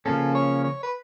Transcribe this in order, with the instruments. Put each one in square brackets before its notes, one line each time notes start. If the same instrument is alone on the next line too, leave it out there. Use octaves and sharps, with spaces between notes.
[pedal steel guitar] C#3 F3 A#3 C#4 [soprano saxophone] A4
[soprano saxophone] C#5
C#5
B4